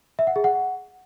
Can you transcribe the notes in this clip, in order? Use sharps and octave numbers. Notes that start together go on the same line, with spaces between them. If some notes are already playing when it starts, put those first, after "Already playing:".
E5
F#5
G#4
F#5